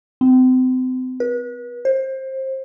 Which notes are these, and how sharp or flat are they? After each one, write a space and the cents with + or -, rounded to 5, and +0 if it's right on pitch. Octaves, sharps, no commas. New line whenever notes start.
C4 -35
B4 -35
C5 +25